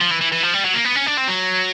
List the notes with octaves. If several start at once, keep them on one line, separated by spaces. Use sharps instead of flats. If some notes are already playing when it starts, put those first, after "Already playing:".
F3
E3
E3
E3
F3
G3
F#3
A#3
B3
C#4
D4
C4
F#3